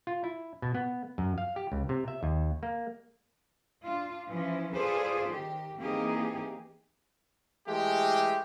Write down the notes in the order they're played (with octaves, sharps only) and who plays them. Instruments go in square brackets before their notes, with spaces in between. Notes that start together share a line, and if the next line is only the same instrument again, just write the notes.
[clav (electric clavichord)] F4
E4
B2
B3
F#2
F5
G4
C#2
C3
E5
D#2
A#3
[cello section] D4 F4
E3 F3 C#4 E4
F4 G#4 A4 B4 C5 D5
D#3 G4
E3 A#3 C4 D#4 G4 G#4
[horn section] E3 G#3 A3 G4